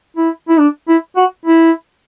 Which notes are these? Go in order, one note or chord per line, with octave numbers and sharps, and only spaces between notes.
E4
E4
D4
E4
F#4
E4